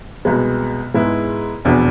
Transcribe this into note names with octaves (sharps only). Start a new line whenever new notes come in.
C2 B2 G#3 B3
G#2 G#3 B3 E4
F1 E2 B2 B3 D4